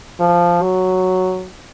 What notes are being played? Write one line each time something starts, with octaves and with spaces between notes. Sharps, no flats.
F3
F#3